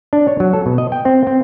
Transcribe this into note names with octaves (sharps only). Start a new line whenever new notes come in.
D4
C#5
F#3
A4
B2
D#5
G5
C4
C4